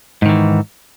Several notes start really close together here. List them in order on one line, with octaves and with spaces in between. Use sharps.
G#2 D#3 E3